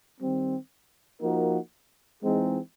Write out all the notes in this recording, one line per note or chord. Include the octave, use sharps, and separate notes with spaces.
D#3 G3 C4
F3 A#3 D#4 F#4 A#4
E3 G#3 C4 D#4 G#4